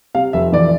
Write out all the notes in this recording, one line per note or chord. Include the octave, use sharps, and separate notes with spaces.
C3 F5
F1 E5
E3 D5